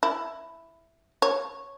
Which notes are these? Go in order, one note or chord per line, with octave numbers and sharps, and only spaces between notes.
E4
C#5